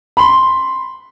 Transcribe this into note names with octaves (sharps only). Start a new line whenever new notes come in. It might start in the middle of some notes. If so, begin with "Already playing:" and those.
B5 C6